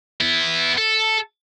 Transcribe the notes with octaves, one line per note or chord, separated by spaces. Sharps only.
B3 E4
A4